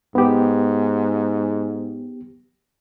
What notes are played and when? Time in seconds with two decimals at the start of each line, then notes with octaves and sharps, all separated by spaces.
0.15 G#2 B3 G4